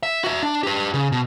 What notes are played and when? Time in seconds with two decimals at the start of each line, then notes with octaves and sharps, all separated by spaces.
0.03 E5
0.24 F#4 E5
0.43 D4
0.63 G4 B4
0.94 C#3
1.12 B2